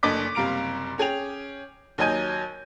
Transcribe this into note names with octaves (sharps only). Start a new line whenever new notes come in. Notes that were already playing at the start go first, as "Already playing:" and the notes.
F#1 D2 D4 D#5 D6 B6
F#1 C3 G3 F5 A#5 D7
C#4 G#4 G5 F7
D#2 F#3 D#5 G#5 G6